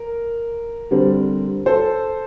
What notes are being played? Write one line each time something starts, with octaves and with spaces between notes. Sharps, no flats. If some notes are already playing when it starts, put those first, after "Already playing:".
Already playing: A#4
D3 G3 C4
A4 C5